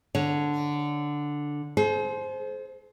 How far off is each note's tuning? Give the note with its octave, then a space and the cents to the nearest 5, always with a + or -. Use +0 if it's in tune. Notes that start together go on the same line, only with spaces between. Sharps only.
D3 +0 C#5 +0
G#4 +45 C5 +0